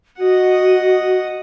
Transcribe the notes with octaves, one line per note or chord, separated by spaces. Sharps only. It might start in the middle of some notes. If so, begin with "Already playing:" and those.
F#4 D#5 F#5